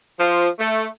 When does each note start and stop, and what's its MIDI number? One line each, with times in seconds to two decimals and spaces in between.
0.18 0.48 53
0.59 0.87 57